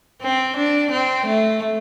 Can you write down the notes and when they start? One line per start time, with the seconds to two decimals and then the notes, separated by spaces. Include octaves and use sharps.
0.22 C4
0.57 D4
0.91 C4
1.26 A3